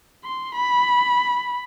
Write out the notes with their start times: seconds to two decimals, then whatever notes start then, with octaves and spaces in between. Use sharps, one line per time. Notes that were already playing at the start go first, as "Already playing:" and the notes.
0.24 C6
0.55 B5